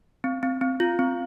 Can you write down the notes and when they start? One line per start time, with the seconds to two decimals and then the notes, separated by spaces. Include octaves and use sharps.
0.24 C4
0.43 C4
0.61 C4
0.80 F4
0.99 C4